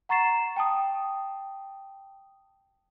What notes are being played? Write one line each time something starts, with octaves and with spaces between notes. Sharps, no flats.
F#5 A#5 C#6 A6 C7 E7
G5 A5 D#6